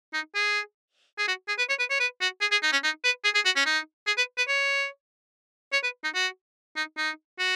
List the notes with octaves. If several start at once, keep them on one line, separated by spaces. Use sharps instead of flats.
D#4
G#4
G#4
F#4
G#4
B4
C#5
B4
C#5
B4
F#4
G#4
G#4
D#4
C#4
D#4
B4
G#4
G#4
F#4
C#4
D#4
G#4
B4
B4
C#5
C#5
B4
D#4
F#4
D#4
D#4
F#4